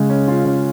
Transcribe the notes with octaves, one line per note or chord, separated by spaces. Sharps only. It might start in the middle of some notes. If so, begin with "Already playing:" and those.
Already playing: C#3 G#3
C#4
F4
C#3